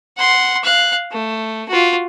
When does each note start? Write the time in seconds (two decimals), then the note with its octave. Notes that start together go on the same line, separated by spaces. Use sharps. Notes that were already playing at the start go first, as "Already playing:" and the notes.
0.17 F#5 C6
0.64 F5 F#6
1.12 A3
1.69 F4 F#4